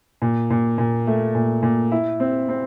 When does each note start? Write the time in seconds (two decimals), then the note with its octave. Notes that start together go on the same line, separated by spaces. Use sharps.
0.22 A#2
0.50 A#2
0.78 A#2
1.07 A3
1.35 A#2
1.63 A#2
1.92 E4
2.20 C4
2.49 C4